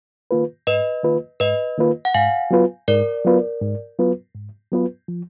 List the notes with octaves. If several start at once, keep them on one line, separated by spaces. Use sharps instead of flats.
D#3 A#3 F4 B4
G#2 B4 D#5
D#3 A#3 F4 B4
G#2 B4 D#5
D#3 A#3 F4 B4
F#5
G#2 F5 G#5
F#3 B3 F4 B4
G#2 A#4 D5
F#3 B3 F4 B4
G#2
F#3 B3 F4 B4
G#2
F#3 B3 F4 B4
F3